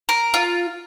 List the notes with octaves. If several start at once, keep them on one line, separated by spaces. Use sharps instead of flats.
A#4
F4